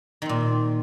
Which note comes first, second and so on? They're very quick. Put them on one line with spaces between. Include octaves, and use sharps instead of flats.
D#3 C4 A#2